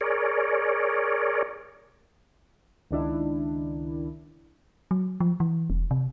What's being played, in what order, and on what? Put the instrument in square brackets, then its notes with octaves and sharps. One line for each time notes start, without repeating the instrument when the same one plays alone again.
[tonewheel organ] G#4 A#4 C#5 D5
[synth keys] C#2 D#3 D4 E4
[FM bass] F#3
F3
E3
E1
C3